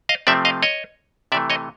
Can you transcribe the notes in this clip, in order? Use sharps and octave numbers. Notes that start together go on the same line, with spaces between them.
D#5 F5
C3 F3 A3 C4 D5 E5
D#5 F5
C#5 D#5
C3 E3 A3 D5 E5
C#5 D#5